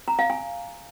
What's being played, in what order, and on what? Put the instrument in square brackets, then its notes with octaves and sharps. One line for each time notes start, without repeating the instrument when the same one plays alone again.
[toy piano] A#5
F5
G#5